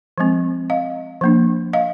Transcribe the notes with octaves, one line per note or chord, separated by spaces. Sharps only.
F3 G#3 C4
D#5 F5
F3 A#3 D4
D#5 F5